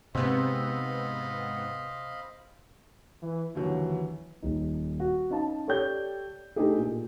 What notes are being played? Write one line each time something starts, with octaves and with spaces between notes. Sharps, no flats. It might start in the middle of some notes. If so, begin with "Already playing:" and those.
G#2 C3 B3 C4 D#5 F5 B5
E3
D#2 D3 E3 F#3
D#1 D#4
F#4
C#4 D#4 F5 A5
G4 A4 C#5 D5 G5 G6
A3 D4 D#4 G4 G#4
A#2